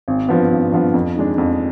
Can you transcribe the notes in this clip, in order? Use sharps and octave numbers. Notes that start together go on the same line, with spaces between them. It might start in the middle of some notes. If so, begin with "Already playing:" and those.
G#1
G2 F3 B3
G#1
G2 F3 B3
F2
D#3 G#3 D4
F2